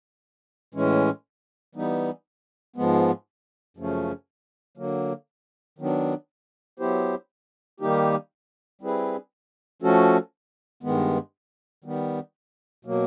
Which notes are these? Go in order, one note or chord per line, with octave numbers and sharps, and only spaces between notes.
A2 E3 G#3 C#4
E3 G3 B3 D#4
G#2 F3 G#3 B3
F#2 C#3 F3 A3 C#4
D3 F#3 A#3
D#3 F#3 B3 D4
F#3 B3 E4 G4 C5
D#3 G3 A#3 D#4 G4
G3 C4 E4 G#4 B4
F3 A3 C#4 F#4 A4
G2 D#3 G#3 B3
D#3 G3 B3
B2 F#3 A#3